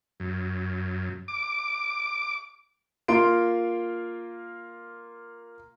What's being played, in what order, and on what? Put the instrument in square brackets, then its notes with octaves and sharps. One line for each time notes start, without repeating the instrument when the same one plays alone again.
[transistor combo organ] F#2
D6
[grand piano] A#3 F4 C6 D7